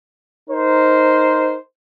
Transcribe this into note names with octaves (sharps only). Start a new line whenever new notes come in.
D#4 A#4 C5